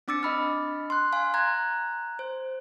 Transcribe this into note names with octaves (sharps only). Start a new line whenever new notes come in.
C4 D4 D6 E6 A6 C#7
D4 D#5 B5 F6
C6 F#6
F5 G#5 C6
A#5 F#6 G#6
C5